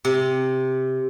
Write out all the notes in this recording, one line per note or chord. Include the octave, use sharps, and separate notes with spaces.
C3